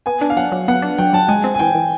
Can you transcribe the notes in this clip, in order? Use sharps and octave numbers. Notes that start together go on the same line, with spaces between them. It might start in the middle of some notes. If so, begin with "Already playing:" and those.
B3 G#5
D4
F5
F#3 F#5
F#3
B3 F#5
D4
F#3 G5
F#3 A5
G#3 G#5
C4
G#5
E3 G5
E3